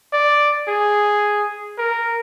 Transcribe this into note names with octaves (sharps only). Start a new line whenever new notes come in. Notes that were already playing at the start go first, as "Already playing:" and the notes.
D5
G#4
A#4